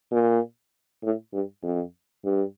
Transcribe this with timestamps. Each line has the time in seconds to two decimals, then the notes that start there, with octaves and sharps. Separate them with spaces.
0.12 A#2
1.03 A2
1.33 G2
1.63 F2
2.25 G2